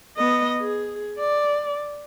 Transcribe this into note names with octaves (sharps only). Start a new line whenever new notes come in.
B3 D#5
G#4
D5